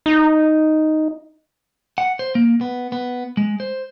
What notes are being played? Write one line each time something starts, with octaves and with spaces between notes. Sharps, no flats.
D#4
F#5
C5
A#3
B3
B3
G#3
C5